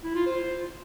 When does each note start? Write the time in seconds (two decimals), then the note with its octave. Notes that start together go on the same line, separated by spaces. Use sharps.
0.04 E4
0.15 F4
0.26 C5